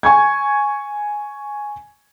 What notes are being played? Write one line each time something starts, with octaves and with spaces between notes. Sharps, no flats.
G#5 C#6 G#6